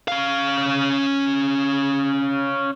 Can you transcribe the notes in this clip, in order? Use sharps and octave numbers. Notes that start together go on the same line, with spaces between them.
C#4 F5